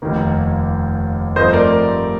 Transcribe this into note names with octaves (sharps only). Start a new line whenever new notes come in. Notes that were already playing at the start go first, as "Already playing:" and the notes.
F1 D#2 D#3 A#3
G2 F3 A3 C4 C5 D#5
A#4 D5